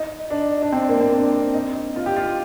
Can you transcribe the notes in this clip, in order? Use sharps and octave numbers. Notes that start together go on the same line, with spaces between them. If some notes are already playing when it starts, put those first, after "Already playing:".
Already playing: D#4
D4
D4
C4
A#3
C4
D4
D#4
F4
G4
F4